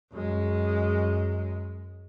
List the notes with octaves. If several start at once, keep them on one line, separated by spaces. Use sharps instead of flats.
F#2 G#3